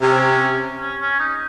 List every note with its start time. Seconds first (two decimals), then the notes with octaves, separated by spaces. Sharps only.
0.02 C3 C#4
0.81 C#4
1.01 C#4
1.19 D#4